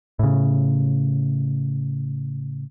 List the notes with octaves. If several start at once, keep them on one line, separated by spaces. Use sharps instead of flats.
A2 C#3